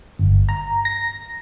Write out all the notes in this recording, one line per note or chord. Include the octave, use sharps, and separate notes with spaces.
G1
A#5
A#6